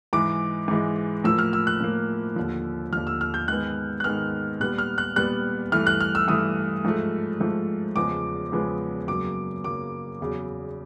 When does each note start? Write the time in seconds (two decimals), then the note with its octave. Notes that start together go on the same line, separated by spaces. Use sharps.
0.13 G#2 E3 G#3 D6
0.68 G#2 E3 G#3
1.24 A2 F3 A#3 E6
1.39 F6
1.53 E6
1.67 F#6
1.80 A2 F3 A#3
2.36 D#2 D3 F3
2.92 D#2 D3 F3 F6
3.07 E6
3.21 F6
3.34 G6
3.48 G#2 D#3 G#3 B3 F#6
4.00 F#6
4.04 G#2 D#3 G#3 B3 F6
4.60 A#2 G3 B3 F#6
4.78 F6
4.98 F#6
5.16 A#2 G3 B3 F#6
5.72 G2 E3 A3 F6
5.87 F#6
6.01 F6
6.15 E6
6.28 G2 E3 A3 D#6
6.85 G#2 F3 A3
7.40 G#2 F3 A3
7.96 E2 C#3 F3 G#3 B3 D6
8.52 E2 C#3 F3 G#3 B3
9.08 F#2 C#3 F#3 A#3 D6
9.64 F#2 C#3 F#3 A#3 D6
10.21 E2 C#3 F#3